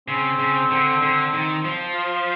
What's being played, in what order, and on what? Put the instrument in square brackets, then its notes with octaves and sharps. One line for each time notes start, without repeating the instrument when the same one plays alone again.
[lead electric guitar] C#3 [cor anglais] C4
[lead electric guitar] C#3
D3
D3
D#3
F3
[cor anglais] F4